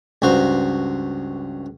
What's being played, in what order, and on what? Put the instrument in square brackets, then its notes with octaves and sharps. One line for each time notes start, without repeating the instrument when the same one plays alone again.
[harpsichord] C#2 G2 F#4 C5 A#5